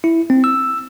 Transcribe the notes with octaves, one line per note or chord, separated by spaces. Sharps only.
E4
C4
E6